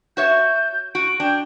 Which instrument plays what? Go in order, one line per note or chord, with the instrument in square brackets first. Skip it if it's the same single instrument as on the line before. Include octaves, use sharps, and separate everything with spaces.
[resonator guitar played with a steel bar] F#4 C#5 E5 [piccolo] G6
[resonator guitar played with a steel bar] F#4 [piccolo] D7
[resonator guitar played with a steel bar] D4 [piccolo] G5